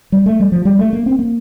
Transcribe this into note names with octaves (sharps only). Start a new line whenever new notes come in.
G3
A3
G3
F3
G3
A3
A#3
C4
A#3